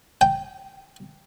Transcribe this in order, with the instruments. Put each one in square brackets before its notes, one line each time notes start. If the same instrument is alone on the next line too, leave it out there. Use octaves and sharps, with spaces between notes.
[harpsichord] G5